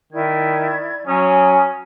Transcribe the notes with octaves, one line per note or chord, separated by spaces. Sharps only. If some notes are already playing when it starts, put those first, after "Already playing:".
D#3 E4 D5 G#6
F#3 C#4 G#5 D#6